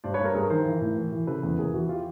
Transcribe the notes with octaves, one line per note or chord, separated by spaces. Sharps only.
G2 C5 D5
B4 C#5
G2
A#4 C5
G2 G#4 A#4
D#3 A#4 C5
E3
A2
E3
E3
C#3 A4 B4
E2
E2 G#4 A#4
E3 F#4
F4 G4